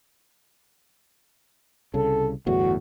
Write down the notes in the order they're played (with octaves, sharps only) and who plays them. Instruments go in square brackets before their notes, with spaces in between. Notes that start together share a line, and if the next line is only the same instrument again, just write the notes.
[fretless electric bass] C2 C#3 [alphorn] A4
[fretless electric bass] G1 E2 A2 [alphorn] F#4